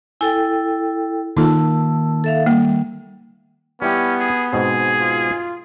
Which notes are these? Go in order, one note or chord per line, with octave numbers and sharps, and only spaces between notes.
E4 A4 G5 G#5
D#3 A#3 D#4 F4 A4 A5 E6
A4 E5 F5
G3 A#3
G3 B3 C#4 E4 G4
G#4
G#2 B2 C4 G#4
F4